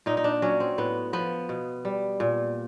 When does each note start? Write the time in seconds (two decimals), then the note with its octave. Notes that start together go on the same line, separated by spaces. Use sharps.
0.06 A#2 D#4
0.17 D#4
0.24 D4
0.42 F#3 C#4
0.60 C4
0.78 A2 B3
1.13 F3 B3
1.49 B2
1.85 G3
2.20 A#2